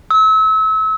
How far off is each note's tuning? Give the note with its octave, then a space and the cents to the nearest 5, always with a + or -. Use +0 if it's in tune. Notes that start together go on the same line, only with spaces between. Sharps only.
E6 -35